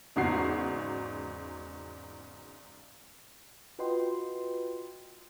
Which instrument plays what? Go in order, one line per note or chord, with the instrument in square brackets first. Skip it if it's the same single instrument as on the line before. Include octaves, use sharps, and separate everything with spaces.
[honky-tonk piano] G#1 E2 G#2 C#3 F#4 C7
[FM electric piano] F4 F#4 B4 D#5 G5 C6